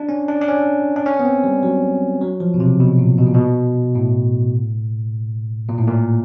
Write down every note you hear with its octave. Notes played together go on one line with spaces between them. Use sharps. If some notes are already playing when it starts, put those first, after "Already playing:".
Already playing: D4
C#4
D4
D4
C#4
D4
C#4
B3
C4
G3
F#3
F#3
F3
B2
C3
B2
A#2
B2
A#2
B2
A2
A#2
A2
A#2